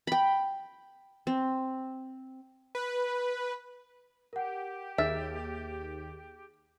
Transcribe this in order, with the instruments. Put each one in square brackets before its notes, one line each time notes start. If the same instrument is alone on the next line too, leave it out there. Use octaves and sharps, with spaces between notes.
[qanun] G5 B5
C4
[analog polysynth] B4
[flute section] G4 [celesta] A#4 F#5
[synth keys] D#2 [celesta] G#4 F6 A6 [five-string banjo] E5